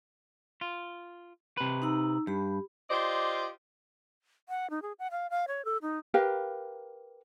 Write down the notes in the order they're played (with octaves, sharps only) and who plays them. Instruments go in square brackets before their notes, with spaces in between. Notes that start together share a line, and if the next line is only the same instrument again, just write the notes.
[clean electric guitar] F4
C3 B4
[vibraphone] D#4 A#5 E6
[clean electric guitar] G2 [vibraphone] G4 B5
[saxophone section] F4 G4 C5 D5 D#5
[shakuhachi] F#5
D#4
G#4
F#5
F5
F5
C#5
A4
D#4
[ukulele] G4 A#4 B4 F5